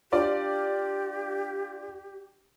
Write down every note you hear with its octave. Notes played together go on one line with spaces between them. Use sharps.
D4 F4 G4 D5